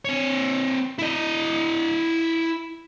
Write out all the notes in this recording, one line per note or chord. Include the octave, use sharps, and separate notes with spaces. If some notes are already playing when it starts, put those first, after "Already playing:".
C4 C#5
E4 D#5